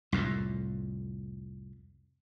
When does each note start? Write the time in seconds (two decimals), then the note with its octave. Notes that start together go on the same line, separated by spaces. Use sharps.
0.12 C2 F2 A2